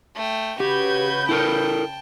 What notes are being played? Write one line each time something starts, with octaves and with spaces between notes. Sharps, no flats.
A3 G5
C#3 F#4 G4 B4 G6 G#6
E4 A4 A#4 G5 A5